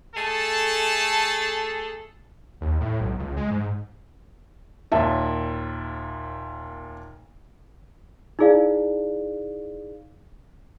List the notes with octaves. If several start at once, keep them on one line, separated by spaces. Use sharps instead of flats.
A3 G#4 A4 A5
D#2
A2
B1
C#2
G#3
G#2
D#2 A#2 E5 A5
D#4 E4 G#4 D5 F5